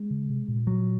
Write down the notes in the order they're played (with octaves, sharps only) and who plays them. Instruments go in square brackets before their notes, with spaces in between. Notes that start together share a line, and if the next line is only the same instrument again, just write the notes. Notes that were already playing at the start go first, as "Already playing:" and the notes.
Already playing: [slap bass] G#3
[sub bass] C#3
C3
A#2
[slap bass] F#3